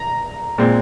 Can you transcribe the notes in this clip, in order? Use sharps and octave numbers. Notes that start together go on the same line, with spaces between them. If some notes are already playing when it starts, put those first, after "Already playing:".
Already playing: A#5
A#2 G#3 C4